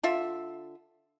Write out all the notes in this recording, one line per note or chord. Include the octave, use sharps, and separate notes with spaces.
D3 F4 E5